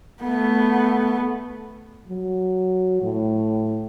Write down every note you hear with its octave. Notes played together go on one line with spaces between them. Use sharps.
A3 B3
F#3
A2